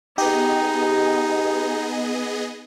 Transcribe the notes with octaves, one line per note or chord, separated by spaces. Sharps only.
B3 D#4 G4 G#4 D#5